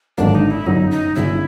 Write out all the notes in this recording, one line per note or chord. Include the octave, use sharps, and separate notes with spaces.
G#1 G2 D3 F#3 A#3 D4
D#4
E4
G1 F#2 C#3 F#3 D#4
D#4
G1 F#2 C#3 F#3 E4